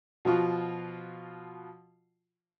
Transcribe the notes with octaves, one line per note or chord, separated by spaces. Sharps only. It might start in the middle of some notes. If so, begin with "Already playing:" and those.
B2 F3 F4 F#4